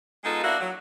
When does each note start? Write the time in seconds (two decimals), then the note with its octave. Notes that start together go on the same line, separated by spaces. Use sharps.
0.24 G#3 B3 D#4 F4 A4
0.43 A#3 D4 E4 F#4
0.60 F#3